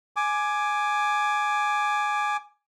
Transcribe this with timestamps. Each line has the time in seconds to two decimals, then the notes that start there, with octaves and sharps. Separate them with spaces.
0.16 G#5 D6